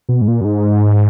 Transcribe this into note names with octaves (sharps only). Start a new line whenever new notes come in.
B2
G#2
A#2
F#2
G#2